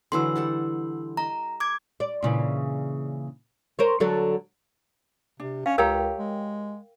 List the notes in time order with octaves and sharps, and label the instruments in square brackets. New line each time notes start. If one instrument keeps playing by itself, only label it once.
[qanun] D3 E3 F#3 [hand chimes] C6 E6
[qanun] G3 A4 F#5
[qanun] D#5 [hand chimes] A#5
[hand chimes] D6 G#6
[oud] D5
A#2 C#3 E3
A#4 C5 C#5
D3 F#3 A4
[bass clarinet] C3 [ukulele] D4
[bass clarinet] C#4 [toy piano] F5
[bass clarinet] C#2 [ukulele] G4 C#5 A#5 [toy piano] A#4 F5 G5
[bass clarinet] G#3